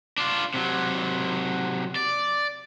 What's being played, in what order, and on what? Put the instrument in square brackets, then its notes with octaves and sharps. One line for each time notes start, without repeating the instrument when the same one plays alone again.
[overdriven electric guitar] D4 F4
C3 F#3
D5